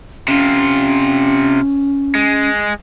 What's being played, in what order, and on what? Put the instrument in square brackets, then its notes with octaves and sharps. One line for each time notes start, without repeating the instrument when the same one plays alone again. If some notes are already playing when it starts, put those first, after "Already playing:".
[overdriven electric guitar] C3 F4 [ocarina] C#4
[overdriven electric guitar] G#3